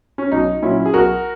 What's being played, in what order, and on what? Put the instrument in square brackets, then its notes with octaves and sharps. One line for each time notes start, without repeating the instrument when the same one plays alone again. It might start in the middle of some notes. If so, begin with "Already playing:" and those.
[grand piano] C#4
B1 D#4
A#2 F#3 C#4 E4
G#4
B1 F#4 A#4